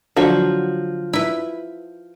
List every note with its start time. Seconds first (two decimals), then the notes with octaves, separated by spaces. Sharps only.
0.16 D3 F3 F#3 F#4
1.13 E4 B4